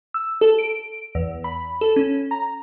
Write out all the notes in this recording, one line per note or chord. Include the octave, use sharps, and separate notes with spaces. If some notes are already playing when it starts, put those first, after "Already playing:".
E6
A4
D7
E2
B5
A4
C#4
A#5